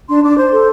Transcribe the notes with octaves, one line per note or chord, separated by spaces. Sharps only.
D4 C6
D4 D6
C5 C6
A4